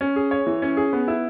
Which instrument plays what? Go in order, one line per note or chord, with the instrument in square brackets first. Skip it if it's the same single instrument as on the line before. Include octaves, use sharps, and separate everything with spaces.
[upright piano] C#4
G#4
C#5
E3
C#4
G#4
B3
E4